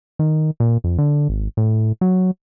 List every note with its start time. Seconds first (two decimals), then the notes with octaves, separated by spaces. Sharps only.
0.19 D#3
0.60 A#2
0.84 F2
0.98 D3
1.29 G#1
1.57 A2
2.01 F#3